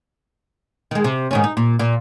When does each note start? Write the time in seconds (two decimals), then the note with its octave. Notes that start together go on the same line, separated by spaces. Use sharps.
0.91 D#3 G#3
1.04 C3
1.31 G#2 D#3 C#4
1.44 D#4
1.57 A#2
1.79 A#2